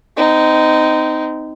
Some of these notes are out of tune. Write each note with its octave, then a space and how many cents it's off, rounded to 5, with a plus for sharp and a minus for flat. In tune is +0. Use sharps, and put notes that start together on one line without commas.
C4 -30 D#4 +0